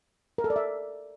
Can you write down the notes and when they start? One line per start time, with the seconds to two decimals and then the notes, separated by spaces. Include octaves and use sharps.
0.38 A#4
0.44 A4
0.50 D5
0.56 E5